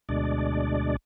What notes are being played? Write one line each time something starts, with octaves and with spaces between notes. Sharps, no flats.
D2 B2 G#3 D4 D5